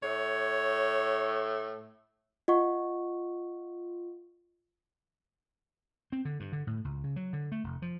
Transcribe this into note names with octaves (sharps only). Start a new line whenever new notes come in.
A2 C#5
F4 D#5 F#5 C#6
C4
D3
G2
D3
A2
C#2
C#3
F#3
D3
A3
F1
F3